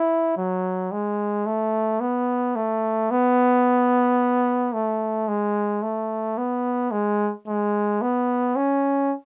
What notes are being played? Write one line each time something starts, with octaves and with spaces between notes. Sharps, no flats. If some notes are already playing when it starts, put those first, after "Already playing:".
Already playing: E4
F#3
G#3
A3
B3
A3
B3
A3
G#3
A3
B3
G#3
G#3
B3
C#4